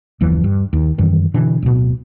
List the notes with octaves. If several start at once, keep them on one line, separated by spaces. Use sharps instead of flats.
F#1 D#2 E3 F3
G2
D#2
F#2 D#3 E3 G3
B2 D3 E3 D4
D1 B2